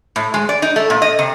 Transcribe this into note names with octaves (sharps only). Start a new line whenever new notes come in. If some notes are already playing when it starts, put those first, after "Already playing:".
A2
G#3
D5
D#4
A3
A#2
D#5
C3